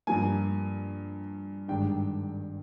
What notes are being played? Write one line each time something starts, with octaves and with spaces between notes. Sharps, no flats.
G2 F3 A#3 G#5
G#1 G2 D#3 G#3 D4 G5